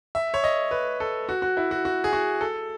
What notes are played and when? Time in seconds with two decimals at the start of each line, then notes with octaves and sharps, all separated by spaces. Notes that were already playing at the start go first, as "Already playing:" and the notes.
0.15 E5
0.34 C#5
0.44 D#5
0.71 B4
1.00 A4
1.29 F#4
1.42 F#4
1.57 E4
1.71 F#4
1.85 F#4
2.04 G#4
2.13 F#4
2.41 A4